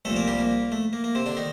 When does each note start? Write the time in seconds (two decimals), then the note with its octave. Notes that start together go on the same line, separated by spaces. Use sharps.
0.05 C2 A#2 F3 A3 A4
0.16 A#3 A#4
0.27 G3 G4
0.39 A#3
0.72 A3
0.93 A#3
1.04 A#3
1.15 C3 C4
1.26 D3 D4
1.37 D#3 D#4